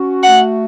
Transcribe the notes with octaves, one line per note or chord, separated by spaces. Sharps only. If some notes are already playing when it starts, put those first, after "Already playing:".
Already playing: C#4 F#4
A3 F#5